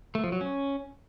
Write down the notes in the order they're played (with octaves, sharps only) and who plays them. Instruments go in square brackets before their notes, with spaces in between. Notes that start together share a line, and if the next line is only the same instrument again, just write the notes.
[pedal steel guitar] A3
F3
F#3
C#4